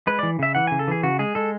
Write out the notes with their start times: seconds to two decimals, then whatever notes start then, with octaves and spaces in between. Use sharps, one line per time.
0.07 G#3 B4
0.19 E3 D5
0.39 C#3 E5
0.55 E3 F#5
0.67 C#3 G#5
0.79 A4
0.88 E3 G#4
1.03 C#3 F#4
1.19 G#3 G#4
1.35 G#3 A4